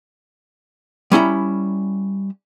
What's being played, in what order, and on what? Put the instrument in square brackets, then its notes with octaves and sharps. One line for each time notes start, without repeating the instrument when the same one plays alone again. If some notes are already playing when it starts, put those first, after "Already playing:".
[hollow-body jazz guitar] G3 C#4 E4 A#5